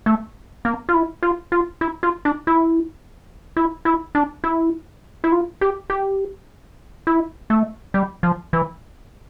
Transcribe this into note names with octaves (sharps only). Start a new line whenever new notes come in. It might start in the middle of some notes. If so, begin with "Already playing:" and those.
A3
A#3
F4
E4
F4
F4
E4
F4
D4
E4
E4
E4
D4
E4
E4
F4
G4
G4
E4
A3
G3
F3
E3